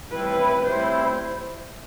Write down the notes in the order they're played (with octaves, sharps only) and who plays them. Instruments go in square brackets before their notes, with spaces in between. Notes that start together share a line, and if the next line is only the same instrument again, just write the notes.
[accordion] A2 G3 C4 E4 [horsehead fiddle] B4
[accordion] A2 G3 C4 E4 [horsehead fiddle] C5